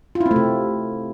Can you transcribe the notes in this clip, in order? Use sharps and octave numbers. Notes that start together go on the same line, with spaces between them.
F4
E4
C4
A3
C3